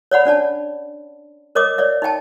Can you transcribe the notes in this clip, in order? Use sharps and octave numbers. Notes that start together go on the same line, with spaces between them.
C#5 D5 F#5 B5
C#4 D4 D5 A5
A#4 C#5 D#5 D6 D#6
C#5 D5 E5
D#4 E5 G5 A5